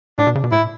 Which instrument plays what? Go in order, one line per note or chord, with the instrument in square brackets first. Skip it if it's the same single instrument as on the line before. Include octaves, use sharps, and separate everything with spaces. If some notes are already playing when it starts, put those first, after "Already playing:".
[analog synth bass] A2 [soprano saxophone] D4
[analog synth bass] B2
C#3
B2
[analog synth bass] A2 [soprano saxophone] E4